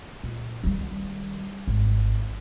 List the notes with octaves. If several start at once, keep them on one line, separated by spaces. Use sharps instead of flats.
A#2
D#3 G3
G#1